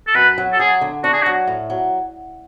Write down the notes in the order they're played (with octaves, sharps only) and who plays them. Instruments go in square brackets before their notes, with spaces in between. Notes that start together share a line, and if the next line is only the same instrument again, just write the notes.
[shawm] A4
[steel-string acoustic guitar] F#2 [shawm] B4
[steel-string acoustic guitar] F#3
[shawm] A4
[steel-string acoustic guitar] F#3 [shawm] G#4
[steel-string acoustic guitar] D3
[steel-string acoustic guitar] D4 [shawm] F#4
[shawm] G#4
F#4
[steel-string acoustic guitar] F#3
A2
F#3